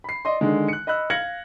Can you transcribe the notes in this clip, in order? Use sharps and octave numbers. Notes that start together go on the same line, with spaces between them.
B5 C7
D5 D#5 C6
D3 D#3 G#3
F#6 C#7
D#5 B5 E6 F#6
F5 F6 G#6 A#6 C#7 F#7